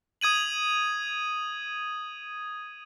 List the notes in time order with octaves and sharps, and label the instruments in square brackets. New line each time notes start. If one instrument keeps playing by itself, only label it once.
[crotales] D#6 G#6 D#7 F#7